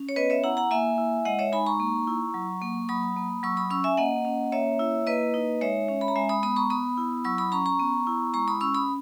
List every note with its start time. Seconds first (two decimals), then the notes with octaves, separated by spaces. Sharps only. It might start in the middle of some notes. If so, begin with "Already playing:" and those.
Already playing: C#4
0.09 C#5
0.16 B3 B4 D#5
0.30 C#5 E5
0.44 E4 F#5 A#5
0.57 F#5 A#5
0.71 A#3 E5 G#5
0.98 E4
1.25 G#3 D#5 F#5
1.39 C#5 E5
1.52 D#4 G#5 B5
1.66 A#5 C#6
1.80 A#3
2.07 E4
2.34 F#3
2.62 A#3
2.89 F#3 B5 D#6
3.16 A#3
3.43 F#3 C#6 E6
3.57 B5 D#6
3.70 C#4 C#6 E6
3.84 E5 G#5
3.97 A#3 D#5 F#5
4.25 C#4
4.52 A#3 C#5 E5
4.79 E4
5.07 A#3 B4 D#5
5.34 D#4
5.61 G#3 C#5 E5
5.88 C#4
6.01 B5
6.08 A#5
6.16 G#3 E5 G#5
6.29 B5 D#6
6.43 B3 B5 D#6
6.56 A#5 C#6
6.70 B3 B5 D#6
6.98 E4
7.25 F#3 C#6 E6
7.38 B5 D#6
7.52 C#4 A#5 C#6
7.66 A#5 C#6
7.79 B3
8.07 E4
8.34 G#3 A#5 C#6
8.48 B5 D#6
8.61 C#4 C#6 E6
8.75 B5 D#6